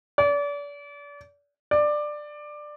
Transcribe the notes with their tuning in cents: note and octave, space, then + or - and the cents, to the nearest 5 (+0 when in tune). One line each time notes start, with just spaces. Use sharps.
D5 -35
D5 +15